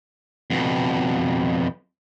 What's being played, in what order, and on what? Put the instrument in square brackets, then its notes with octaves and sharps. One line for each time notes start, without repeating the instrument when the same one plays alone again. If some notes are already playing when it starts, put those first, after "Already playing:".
[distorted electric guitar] F2 B2